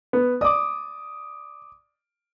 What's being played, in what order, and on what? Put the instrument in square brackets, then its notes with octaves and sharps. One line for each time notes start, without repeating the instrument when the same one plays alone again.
[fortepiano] B3
[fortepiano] D5 [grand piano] D6 D#6